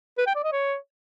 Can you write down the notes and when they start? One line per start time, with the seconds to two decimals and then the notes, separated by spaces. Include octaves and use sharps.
0.18 B4
0.27 G5
0.35 D5
0.44 D#5
0.52 C#5